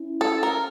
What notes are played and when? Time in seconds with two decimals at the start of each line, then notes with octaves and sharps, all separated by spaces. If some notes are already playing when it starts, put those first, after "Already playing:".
Already playing: C#4 E4
0.21 A4
0.43 A#4